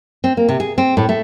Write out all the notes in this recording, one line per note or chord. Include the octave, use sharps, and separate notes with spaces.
C4
A#3
C3
G#4
C4
A2
A3